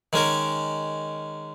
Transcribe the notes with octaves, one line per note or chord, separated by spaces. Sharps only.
D#3 G#3 C#4 A#4